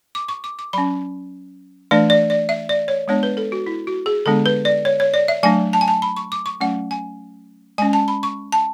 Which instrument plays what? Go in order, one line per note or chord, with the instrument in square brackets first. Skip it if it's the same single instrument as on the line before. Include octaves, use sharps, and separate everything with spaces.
[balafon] D6
C#6
D6
D6
F#3 C#4 B5
E3 A3 D4 D5
D5
D5
E5
D5
C#5
G#3 B3 D4 C#5
B4
A4
F#4
E4
F#4
G#4
D3 G#3 B3 D4 A4
B4
D5
C#5
C#5
D5
E5
F#3 A3 D4 G#5
A5
G#5
A5
B5
C#6
D6
C#6
F#3 A3 C#4 F#5
G#5
G#3 G#5
C#4
A5
B5
C#6
A5